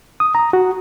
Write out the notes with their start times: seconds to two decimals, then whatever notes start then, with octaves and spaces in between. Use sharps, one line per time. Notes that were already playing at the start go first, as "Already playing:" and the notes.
0.20 D#6
0.35 A#5
0.53 F#4